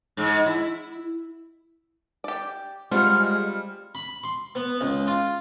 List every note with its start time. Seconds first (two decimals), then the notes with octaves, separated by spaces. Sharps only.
0.17 G#2
0.46 E4
2.24 G4 D5
2.91 G3 G#3 C4 F4 F#4 F6
3.95 B5
4.24 C6
4.55 B3
4.81 C#2
5.07 F4